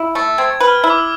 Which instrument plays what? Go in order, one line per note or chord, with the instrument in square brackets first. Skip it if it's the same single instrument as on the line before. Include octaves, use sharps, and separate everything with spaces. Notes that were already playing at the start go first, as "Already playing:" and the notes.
Already playing: [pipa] E4
A3
[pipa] C4 [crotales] G#6
[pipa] B4
[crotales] F6
[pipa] E4
[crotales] D6
E6